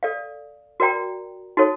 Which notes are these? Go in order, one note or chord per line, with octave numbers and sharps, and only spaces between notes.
A4 D5 F5
F#4 A#4 D5 G5 A#5
D#4 F#4 A4 C#5